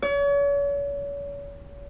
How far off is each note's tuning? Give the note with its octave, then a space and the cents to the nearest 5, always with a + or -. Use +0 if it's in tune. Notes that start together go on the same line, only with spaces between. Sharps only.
C#5 +40